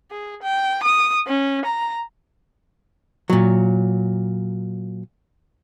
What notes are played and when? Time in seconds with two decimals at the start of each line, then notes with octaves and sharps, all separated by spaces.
0.11 G#4
0.42 G5
0.83 D#6
1.27 C#4
1.65 A#5
3.30 A#2 F#3